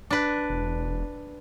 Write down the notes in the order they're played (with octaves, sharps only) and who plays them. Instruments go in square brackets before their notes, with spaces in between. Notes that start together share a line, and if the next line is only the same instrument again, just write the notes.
[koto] D4 B4
[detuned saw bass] E1